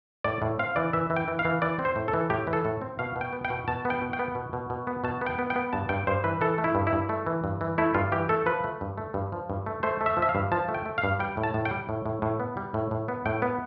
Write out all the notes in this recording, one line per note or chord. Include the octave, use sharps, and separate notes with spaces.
A2 D5
A2
C4 F5
E3 D5
E3 E5
E3
G5
E3
F5
E3
E3 D5
C4
C5
A2
A4
E3
A2 G4
E3
A4
A2
C4
B2 F5
B2
G5
B3
G5
B2
B2 A5
B3
G5
B2
G5
B3
B2
B2
B2
B3
B2 A5
B3
G5
B3
G5
B3
G2 A5
G2 G5
G2 C5
E3 B4
E3 A4
A3
E4
G2
E4
G2
A3
E3
G2
E3
A3 E4
G2 F4
E3 G4
A3 A4
F3 B4
A3
G2
A3
G2
F3
G2
A3
A3 C5
A3
E5
F3
E5
F5
G2
F3 A5
A3
G5
A3
F5
G2
G3 G5
A2
A5
A2
G5
G3
A2
A2
A2
B3
G3
A2
A2
B3
A2 G5
B3